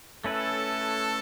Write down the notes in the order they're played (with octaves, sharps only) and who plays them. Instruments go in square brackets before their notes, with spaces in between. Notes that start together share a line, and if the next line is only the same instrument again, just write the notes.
[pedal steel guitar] A3 C#4 E4 B4 [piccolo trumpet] A4